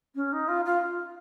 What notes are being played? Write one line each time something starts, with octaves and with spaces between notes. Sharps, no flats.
C#4
D#4
F4
F4